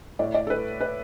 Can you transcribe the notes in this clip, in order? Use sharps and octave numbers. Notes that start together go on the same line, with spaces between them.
A2 A3 D5
D5
A4
B4
B4